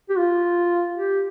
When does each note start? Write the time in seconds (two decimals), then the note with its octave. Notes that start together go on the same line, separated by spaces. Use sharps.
0.10 G4
0.18 F4
0.97 G4